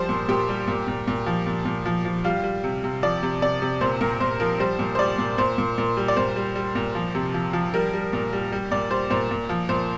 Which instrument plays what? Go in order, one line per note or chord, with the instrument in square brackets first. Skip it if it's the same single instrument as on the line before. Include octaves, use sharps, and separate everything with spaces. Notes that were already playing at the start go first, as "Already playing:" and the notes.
Already playing: [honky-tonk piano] F3 G3 C5
A#2
A#2 G4
G3
A#2
A#2
A#2
F3
A#2
A#2
F3
F3
G3 F4
G3
C3
C3
F3 D5
C3
C3 D5
C3
A#2 C5
A#2 A#4
A#2 C5
F3 A#4
G3 C5
A#2
C5
G3 D5
A#2
A#2 C5
A#2
A#2
G3
D5
A#2 C5
G3
G3
A#2
F3
C3
F3
F3
G3 A#4
G3
A#2
G3
G3
A#2 D5
G3 C5
A#2 C5
A#2
F3
A#2 C5